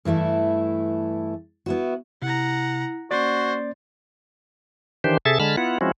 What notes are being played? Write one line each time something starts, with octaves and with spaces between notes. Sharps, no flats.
G2 E3 A3 E4
B3 E4 F#4
C3 E4 F#5 A#5
A#3 C#4 F#4 C5 D5 A6
D#3 E3 D4 G4 C5
C3 G#4 A4 E5 A6
D3 G#3 A5 B5 F6
B3 E4 F4 F#5
F3 G#3 C4 C#4 E4 F#4